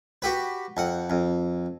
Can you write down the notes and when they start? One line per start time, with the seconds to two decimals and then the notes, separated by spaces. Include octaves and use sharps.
0.22 F#4 G4 B4
0.77 F2 F#5
1.10 F2